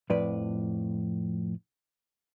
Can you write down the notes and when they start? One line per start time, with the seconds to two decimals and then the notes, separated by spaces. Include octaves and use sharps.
0.10 F2 A2 F3 B4 D5